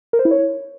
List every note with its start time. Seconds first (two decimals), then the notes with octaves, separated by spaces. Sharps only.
0.13 A#4
0.19 C5
0.25 E4
0.31 C#5